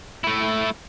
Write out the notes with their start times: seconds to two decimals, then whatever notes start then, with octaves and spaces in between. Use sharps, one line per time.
0.24 A3 E4